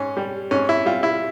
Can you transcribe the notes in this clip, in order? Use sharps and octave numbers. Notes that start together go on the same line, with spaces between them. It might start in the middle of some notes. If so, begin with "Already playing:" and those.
Already playing: G#2 C#4
G3
G#2 C#4
E4
G3 F4
E4